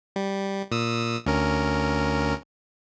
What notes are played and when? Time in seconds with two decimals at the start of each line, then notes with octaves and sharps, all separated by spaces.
0.16 G3
0.72 A#2 D#6 E6
1.26 D2 C#4 A#4